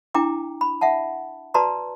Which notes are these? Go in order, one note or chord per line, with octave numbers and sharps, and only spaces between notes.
D4 E4 G5 A#5 D6
B5
E5 F#5 A5
F#4 B4 D5 A5 A#5 C6